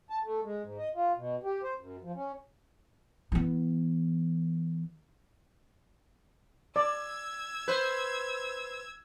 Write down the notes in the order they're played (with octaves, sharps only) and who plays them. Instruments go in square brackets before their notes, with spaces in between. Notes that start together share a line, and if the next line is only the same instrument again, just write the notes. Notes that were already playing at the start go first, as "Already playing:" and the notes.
[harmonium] A5
A3
G#3
G#2
D#5
F4
B2
G4
C5
F#2
F3
C#4
[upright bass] E3 B3
[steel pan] D5 [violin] E6 G#6
[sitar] B4 C5